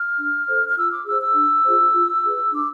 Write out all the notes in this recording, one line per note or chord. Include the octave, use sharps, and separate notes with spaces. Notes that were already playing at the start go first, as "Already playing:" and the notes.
Already playing: F6
D4
A4 C5
F6
F4 E6
D6
G#4 C5 E6
E6
D4
F4 G#4 C5
F4
G#4 B4
D4 D6